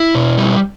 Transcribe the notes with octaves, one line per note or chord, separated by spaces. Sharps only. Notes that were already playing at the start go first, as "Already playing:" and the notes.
Already playing: E4
B2
G3